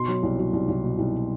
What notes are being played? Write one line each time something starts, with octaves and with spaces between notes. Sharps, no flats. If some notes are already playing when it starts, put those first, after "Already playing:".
Already playing: B2 C6
F#3
C2
F#3
C2
C2
B2
C2